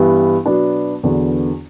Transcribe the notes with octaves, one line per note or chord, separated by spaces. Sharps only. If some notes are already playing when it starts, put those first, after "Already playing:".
Already playing: G2 E3 G3 B3
B2 F#3 B3 D4
E2 D3 F#3 B3 D4